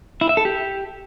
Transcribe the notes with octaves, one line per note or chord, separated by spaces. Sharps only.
E4
E5
A4
G4